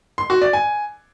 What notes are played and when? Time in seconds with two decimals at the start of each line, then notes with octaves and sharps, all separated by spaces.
0.18 C6
0.30 F#4
0.42 D5
0.53 G#5